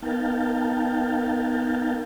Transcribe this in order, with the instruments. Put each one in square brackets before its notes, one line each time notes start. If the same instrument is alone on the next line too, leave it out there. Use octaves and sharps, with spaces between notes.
[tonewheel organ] B3 D#4 A#4 F5 G5 A5